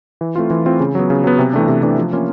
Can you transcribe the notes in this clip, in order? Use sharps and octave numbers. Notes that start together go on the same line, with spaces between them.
E3
A3 C4 F4
E3
A3 C4 F4
C#3
F#3 B3
C#3
F#3 B3
C3
E3 A3 D4
C3
E3 A3 D4
F3
A#3 C#4 F4